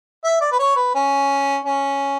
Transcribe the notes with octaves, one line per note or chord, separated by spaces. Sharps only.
E5
D5
B4
C#5
B4
C#4
C#4